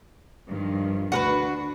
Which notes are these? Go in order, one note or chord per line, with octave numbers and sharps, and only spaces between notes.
G2 D#3 F3
D2 D4 F#4 A#4 B4